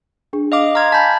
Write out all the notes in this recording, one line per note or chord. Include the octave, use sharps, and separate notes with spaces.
D4 G#4
D#5 F5 D6
A#5 C6 D6 F6 G#6
G#5 A5 B5 G6 B6